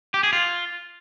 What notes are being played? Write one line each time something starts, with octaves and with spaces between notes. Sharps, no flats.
G4
G#4
F4